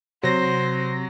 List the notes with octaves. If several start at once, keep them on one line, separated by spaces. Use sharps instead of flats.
C3 F#3 C5 A#6